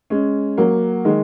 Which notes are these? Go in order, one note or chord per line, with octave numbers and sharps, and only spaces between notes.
G#3 C#4
F#3 A#3
D#3 G#3